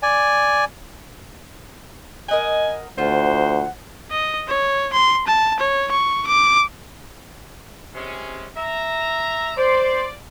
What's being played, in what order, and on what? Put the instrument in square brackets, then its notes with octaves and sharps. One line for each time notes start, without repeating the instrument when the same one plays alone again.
[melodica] D5 G#5
[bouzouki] A#4 D#5 F#5 [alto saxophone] G#5
[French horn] D2 [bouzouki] F4 [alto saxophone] C5 [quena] F#5
[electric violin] D#5
C#5
C6
A5
C#5
C#6
D6
[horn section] C3 G#3 C#4
E5 A#5
[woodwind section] C5 C6 [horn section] D5